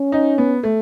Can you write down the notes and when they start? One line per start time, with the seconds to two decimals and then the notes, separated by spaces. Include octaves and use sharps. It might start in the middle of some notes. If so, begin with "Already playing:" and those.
Already playing: C#4
0.12 D#4
0.38 B3
0.63 A3